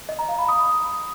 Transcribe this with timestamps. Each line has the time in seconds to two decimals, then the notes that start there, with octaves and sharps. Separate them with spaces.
0.09 D#5
0.19 A#5
0.29 F5
0.39 B5
0.49 D#6